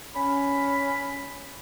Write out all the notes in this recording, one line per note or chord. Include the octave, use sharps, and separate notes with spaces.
C#4 B5